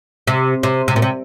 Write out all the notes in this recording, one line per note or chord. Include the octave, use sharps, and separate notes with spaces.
C3
C3
C3
A#2
C3